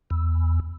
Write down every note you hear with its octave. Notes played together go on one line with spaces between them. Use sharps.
E2